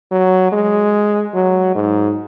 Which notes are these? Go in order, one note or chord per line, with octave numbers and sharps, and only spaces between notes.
F#3
G#3
F#3
G#2